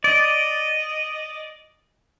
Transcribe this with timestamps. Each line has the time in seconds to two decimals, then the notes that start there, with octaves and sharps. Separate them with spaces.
0.04 D5 D#5